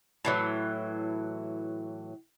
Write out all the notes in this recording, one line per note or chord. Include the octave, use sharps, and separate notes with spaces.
A2 E3 F#3